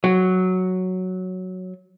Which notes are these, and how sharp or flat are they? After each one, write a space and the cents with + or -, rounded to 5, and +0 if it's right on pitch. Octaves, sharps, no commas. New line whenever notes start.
F#3 +0